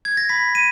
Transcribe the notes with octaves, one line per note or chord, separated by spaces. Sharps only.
G#6
A#6
B5 B6
D#7